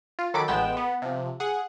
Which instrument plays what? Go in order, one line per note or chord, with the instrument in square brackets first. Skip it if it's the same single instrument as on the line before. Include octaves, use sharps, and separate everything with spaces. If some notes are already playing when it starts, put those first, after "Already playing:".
[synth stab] F4
D#3 F#3 A4 B5 D6 D7
A1 G#3 B3 G5 E7
B3
C3 F3
G#4 F#5